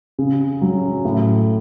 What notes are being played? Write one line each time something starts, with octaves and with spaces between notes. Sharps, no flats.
C#3
F#3 C#4
A2